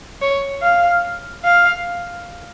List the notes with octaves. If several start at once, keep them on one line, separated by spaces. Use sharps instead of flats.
C#5
F5
F5